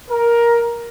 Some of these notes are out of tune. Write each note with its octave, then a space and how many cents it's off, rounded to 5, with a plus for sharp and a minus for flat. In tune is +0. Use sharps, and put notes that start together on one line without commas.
A#4 +10